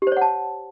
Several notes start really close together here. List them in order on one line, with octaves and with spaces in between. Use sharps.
G4 C5 C#5 F#5 A5